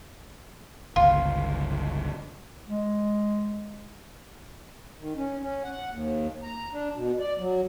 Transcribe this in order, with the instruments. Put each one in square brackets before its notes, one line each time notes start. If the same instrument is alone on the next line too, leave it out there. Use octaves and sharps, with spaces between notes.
[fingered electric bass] G1 C#2 [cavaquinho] F4
[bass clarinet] G#3
[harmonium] D#3
C#4
C#4
F#5
D#2
A#5
D4
B2
D5
F#3